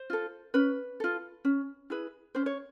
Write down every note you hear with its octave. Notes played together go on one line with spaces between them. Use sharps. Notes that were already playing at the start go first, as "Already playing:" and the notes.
Already playing: C5
F4 A4
C#4 B4
F4 A4
C#4
E4 G#4 B4
C#4 C5
C#5